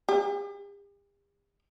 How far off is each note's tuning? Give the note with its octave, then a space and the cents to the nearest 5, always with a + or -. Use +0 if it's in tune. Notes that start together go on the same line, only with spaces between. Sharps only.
G4 +45